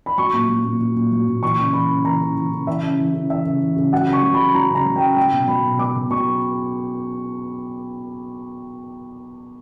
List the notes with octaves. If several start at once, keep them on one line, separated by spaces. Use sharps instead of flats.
B5
F#3 C#6
A#2
F#3
A#2
F#3
A#2
F#3
A#2
E3 C#6
C#3
E3 B5
C#3
E3 A#5
C#3
E3
C#3
E3 E5
C#3
E3
C#3
E3 E5
C#3
E3
C#3
F#3 F#5
C#3
C#6
F#3
C#3 B5
F#3 A#5
C#3
A#5
F#3
G5
C#3
F#3 G5
B2
F#3 B5
B2
F#3 D6
B2
F#3 C#6